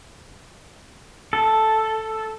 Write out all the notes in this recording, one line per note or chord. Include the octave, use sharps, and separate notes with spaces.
A4